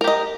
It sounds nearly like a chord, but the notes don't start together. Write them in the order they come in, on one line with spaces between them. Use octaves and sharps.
A#4 G4 D#5